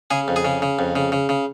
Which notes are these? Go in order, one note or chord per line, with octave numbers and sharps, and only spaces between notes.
C#3 G#4
F2
G#4
C#3
C#3
F2
C#3
C#3
C#3